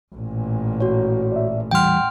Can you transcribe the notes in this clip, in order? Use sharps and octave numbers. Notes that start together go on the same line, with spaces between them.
A1 A#2
F#4 C#5
D5 E5
E2 E3 G3 F#5 G5 C6 F6